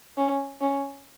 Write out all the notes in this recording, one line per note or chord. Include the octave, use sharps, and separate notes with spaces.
C#4
C#4